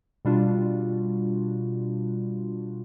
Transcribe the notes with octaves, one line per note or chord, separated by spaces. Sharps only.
B2 G3 D4 F4 F#4